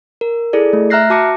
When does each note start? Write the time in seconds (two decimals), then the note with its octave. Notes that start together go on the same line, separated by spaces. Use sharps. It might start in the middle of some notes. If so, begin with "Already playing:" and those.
0.21 A#4
0.53 E4 G#4 A4 D5
0.73 A3
0.90 E5 A#5 F6 F#6 A#6 C7
1.10 F#4 A5 D6 A#6 C#7